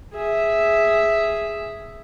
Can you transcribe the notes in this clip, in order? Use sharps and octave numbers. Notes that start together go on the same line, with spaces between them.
G#4 E5